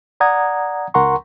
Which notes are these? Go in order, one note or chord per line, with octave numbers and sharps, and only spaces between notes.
D5 F#5 A#5 D#6 G#6
C#2 A#4 F#5 A#5 C6 C#6